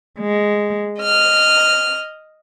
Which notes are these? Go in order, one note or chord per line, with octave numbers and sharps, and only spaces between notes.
G#3
D#5 F6